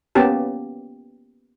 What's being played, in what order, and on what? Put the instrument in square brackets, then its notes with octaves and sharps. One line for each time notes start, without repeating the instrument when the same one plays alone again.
[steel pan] A#3 B3 C#4 G4 A5